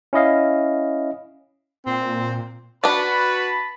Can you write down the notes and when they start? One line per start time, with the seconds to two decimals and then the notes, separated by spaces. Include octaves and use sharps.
0.13 C#4 E4 D#5 F5
1.86 A#2 C4
2.84 D4 F#4 B4 D5 A5 B5